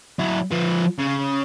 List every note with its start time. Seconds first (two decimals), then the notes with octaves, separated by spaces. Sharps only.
0.19 F#3 E4
0.51 F3 B4
0.99 C#3